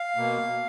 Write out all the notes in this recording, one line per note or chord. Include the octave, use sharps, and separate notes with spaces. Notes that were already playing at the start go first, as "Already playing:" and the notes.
Already playing: F5
B2 A#3